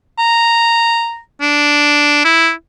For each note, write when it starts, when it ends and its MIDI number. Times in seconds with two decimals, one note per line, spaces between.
0.19 1.19 82
1.41 2.20 62
2.25 2.52 64